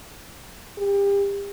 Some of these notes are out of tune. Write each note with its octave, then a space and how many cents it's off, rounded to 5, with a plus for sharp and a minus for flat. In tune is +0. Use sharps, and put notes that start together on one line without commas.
G4 +35